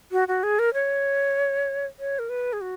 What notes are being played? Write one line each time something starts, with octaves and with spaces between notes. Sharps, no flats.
F#4
F#4
G#4
A#4
C#5
C#5
A#4
B4
G#4
F#4